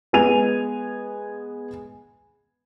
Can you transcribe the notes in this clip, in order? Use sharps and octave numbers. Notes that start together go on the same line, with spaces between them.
G#3 B3 G#5 D#7 F7